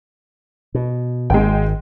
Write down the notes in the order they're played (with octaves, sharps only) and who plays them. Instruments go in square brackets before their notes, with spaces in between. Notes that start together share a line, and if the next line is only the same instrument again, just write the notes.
[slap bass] B2
[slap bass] G#1 [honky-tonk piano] G#3 G5